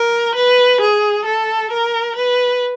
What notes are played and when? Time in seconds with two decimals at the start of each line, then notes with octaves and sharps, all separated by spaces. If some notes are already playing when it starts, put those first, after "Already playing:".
Already playing: A#4
0.35 B4
0.81 G#4
1.25 A4
1.71 A#4
2.16 B4